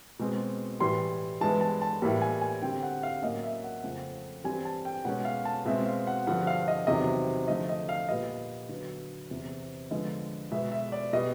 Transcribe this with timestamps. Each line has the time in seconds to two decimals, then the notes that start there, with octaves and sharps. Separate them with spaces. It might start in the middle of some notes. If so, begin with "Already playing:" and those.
0.19 B2 G#3 C4
0.80 A2 E3 G3 C6
1.41 G2 E3 G#3 B3 A5
1.61 A5
1.82 A5
2.01 A2 E3 G3 A#3
2.22 G#5
2.41 G#5
2.62 D3 G3 C4 G5
2.83 F#5
3.03 F5
3.22 A2 F#3 A#3 C#4 D#5
3.43 E5
3.64 F#5
3.83 F2 C#3 F3 A3
4.44 G2 E3 G3 C4 G#5
4.65 A5
4.85 G5
5.05 B2 G#3 C#4 F#5
5.25 F5
5.45 A5
5.65 B2 G#3 C4 E5
5.86 F5
6.07 F#5
6.27 G2 D3 F3 F#5
6.47 F5
6.68 D#5
6.87 E2 C3 D#3 F#3 D#5
7.48 D3 F3 A3 D#5
7.69 D#5
7.89 F5
8.08 A#2 G3 B3 D#5
8.69 D3 F#3 B3
9.31 E2 C3 E3
9.91 D3 F3 G#3 B3 D#5
10.51 B2 G#3 B3 E5
10.72 E5
10.92 D5
11.13 B2 G3 D#5